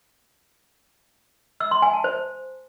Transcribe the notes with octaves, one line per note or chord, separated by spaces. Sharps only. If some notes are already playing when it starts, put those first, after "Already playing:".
E6
C6
G#5
A5
C5